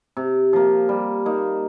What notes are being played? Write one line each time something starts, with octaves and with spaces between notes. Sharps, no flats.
C3
F3 A#3
G3
A#3 D#4